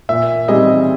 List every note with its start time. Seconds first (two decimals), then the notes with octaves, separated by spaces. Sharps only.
0.09 A#2 E5
0.48 G3 C4 D#4 G#4 D#5